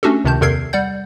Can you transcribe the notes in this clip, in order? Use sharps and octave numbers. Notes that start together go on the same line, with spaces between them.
A3 C#4 D4 F#4 G4 A4
C#2 C3 D#3 A5 G6
E2 C3 A4 A#4 G#6 C7
G3 D5 F#5 G6